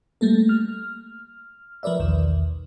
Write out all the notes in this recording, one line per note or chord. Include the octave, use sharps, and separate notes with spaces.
G3 A3 A#3 A4
F6
F3 A#4 B4 D5 E5
B1 E2 D#3